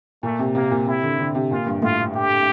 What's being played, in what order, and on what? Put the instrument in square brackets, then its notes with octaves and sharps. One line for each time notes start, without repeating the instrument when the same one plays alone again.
[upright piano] A#2 [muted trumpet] A3
[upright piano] C3
[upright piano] C3 [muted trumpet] A#3
[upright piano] A#2
[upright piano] C3 [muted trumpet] E4
[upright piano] D3
D3
C3
[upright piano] A#2 [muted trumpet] F4
[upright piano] G2
[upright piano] A2 [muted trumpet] F4
[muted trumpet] G4